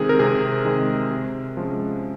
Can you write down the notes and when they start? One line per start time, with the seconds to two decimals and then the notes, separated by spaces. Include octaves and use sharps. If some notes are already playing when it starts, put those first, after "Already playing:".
Already playing: C3 D#3 G#3 C4 G#4
0.09 A#4
0.19 C3 G#4
0.65 D#3 G#3 C4
1.11 C3
1.57 F3 G#3 C#4